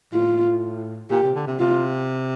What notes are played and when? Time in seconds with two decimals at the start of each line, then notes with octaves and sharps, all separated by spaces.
0.13 A2 F4
1.10 A#2 G4
1.23 C3
1.35 D3
1.47 C3
1.60 C3 F4